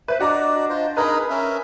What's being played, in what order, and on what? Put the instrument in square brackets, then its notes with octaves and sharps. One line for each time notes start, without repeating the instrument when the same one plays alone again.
[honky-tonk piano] B4 [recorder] C5 [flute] E5
[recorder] D4 [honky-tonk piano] F#4 A#5 D6 [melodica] D5 [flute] D#5
[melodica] F4 C5
[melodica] D#4 G#4 A#4 [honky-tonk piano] B4 B5
[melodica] C#4 A#4 E5